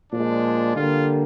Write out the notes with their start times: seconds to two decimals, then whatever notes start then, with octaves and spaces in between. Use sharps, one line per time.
0.12 A#2 F3 G#3 D4
0.75 D3 G3 A#3 F4